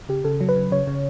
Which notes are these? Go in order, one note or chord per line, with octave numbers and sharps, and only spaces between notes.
C#3 G4
C#3 A4
F#3
B4
C#3
C#3 C#5
C#3